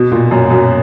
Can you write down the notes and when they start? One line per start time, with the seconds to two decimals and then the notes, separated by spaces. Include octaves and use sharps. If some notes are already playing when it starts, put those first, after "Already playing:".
Already playing: B2
0.11 A#2
0.31 F#2
0.50 F#2